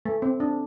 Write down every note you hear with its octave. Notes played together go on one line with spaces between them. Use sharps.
A3
C4
D4